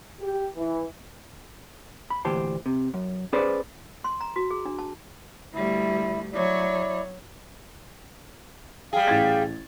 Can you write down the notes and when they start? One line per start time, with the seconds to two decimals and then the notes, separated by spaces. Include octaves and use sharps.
0.20 G4
0.56 E3
2.10 B5
2.25 D2 A#2 E3 G4 C5 A5
2.66 C3
2.94 F#2
3.33 C#4 G#4 B4 C5 D5
4.04 C6
4.21 A#5
4.36 F#4
4.51 G#4
4.65 D4
4.79 A5
5.54 D2 G3 E4
6.33 F#3 E4 C#5 D5
8.93 G3 G#4 F5 G5
9.07 A1 G#6 A6